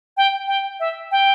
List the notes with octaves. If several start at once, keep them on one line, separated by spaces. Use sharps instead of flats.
G5
G5
E5
G5